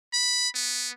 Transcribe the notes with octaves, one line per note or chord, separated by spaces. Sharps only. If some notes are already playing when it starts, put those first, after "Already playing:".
B5
B3